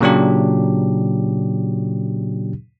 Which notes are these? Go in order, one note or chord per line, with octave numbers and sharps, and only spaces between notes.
A#2 C#3 F#3 D4 G4